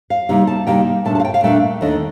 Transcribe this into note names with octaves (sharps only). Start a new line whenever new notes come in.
F5
C3 G3 A#3 D#4
A5
C3 G3 A#3 D#4 G5
A#2 A3 D4 A5
A5
F5
G5
F5
A#2 A3 D4 G5
D#2 D#3 A3 D4 D#5